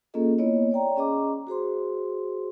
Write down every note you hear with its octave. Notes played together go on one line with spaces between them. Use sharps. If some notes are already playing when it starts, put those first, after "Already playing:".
A#3 C#4 F4 G#4 A4 D#5
A#3 B3 E4 C#5 D#5
C#5 D5 G5 A#5
C#4 G#4 D#5 A#5 D6
F#4 G#4 C5 C6